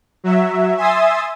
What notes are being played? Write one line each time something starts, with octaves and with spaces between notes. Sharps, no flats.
F#3 E5
E5 G#5 C6 D#6 E6 A6